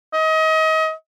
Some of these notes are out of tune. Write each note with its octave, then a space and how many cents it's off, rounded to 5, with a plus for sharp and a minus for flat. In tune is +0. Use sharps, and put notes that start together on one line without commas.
D#5 +30